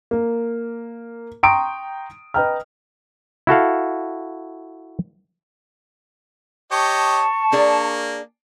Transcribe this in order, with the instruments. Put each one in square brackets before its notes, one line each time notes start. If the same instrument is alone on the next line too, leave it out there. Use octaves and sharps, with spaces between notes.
[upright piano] A#3
G5 A#5 C6 C#6 D#6 D7
B4 D#5 G5 A#5 F6
[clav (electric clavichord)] E4 F#4 A4 F5
[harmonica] G4 C#5 D#5 [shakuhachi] A5 [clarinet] C#6
[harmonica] A#3 [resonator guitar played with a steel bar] D4 G#4 D5